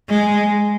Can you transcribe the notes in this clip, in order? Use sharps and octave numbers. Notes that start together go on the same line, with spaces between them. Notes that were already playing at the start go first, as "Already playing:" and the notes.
G#3